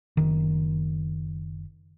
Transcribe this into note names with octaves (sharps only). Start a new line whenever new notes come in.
F#1 D#3